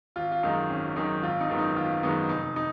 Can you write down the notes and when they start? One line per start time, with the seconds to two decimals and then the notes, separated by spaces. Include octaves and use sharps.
0.16 G#1 F4
0.32 F4
0.43 F#2 D#3 G#3 D#4
0.70 G#1 C#4
0.96 F#2 D#3 G#3 D#4
1.23 G#1 F4
1.41 D#4
1.50 F#2 D#3 G#3 B3
1.59 D#4
1.76 G#1 F4
2.03 F#2 D#3 G#3 B3 D#4
2.29 F1 D#4
2.56 D#4